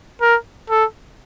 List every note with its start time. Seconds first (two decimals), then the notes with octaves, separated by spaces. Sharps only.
0.21 A#4
0.70 A4